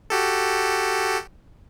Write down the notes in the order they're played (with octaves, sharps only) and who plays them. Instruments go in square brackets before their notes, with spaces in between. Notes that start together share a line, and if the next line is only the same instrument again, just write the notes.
[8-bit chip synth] F#4 G4 A4